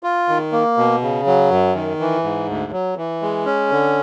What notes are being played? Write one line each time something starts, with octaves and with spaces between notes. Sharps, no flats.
F4
D#3
A#3
B2
C#3
F#3
F#2
D#3
E3
G#2
D2
F#3
E3
G#3
C#4
D3